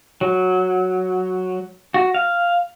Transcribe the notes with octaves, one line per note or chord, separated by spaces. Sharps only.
F#3
F#4
F5